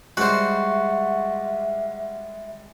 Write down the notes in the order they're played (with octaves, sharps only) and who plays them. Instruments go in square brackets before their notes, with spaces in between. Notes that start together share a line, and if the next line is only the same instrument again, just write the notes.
[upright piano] G3 G#3 [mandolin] F#4 [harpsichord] C5 F#5 [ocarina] E5